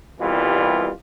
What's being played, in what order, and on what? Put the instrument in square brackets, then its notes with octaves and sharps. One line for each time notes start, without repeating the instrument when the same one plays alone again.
[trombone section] C2 B2 E3 G3 F4